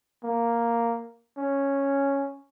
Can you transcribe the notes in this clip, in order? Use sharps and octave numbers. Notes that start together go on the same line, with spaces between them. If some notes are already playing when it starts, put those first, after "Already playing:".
A#3
C#4